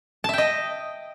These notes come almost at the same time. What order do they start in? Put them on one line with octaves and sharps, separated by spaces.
A5 E5 G5 D#5